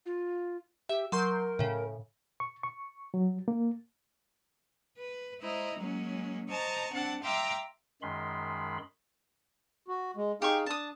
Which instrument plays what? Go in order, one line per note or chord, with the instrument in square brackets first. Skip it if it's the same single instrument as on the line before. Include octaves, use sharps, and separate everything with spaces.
[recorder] F4
[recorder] G4 [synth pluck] E5
[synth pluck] F#3 C6 G6 [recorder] A#4
[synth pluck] A2 C#3
[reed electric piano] C#6
C#6
F#3
A#3
[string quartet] B4
G#3 E4 C5 D#5 A#5
F#3 G#3 A#3 C#4
C5 D#5 A5 A#5 C#6
C4 D4 F#5 A5
E5 F5 G5 A#5 C6 D6
[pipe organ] F#2 D#3 G#3 B5 C6
[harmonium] F#4
G#3
[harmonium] D#4 G#4 F5 [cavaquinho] G4 C#6
[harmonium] D4 [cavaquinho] A5 D#6